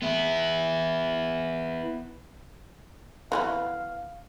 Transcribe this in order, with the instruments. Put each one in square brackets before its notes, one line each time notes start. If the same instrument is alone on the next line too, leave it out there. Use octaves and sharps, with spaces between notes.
[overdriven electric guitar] B3 E4
[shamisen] E3 G#3 B3 [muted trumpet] F5